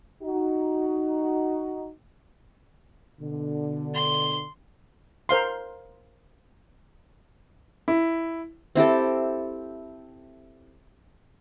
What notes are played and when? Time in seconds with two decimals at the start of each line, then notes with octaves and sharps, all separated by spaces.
0.23 D#4 F#4
3.21 B2 D3
3.94 C6
5.29 A#4 C5 F5 C6
7.88 E4
8.75 C4 E4 G4 A4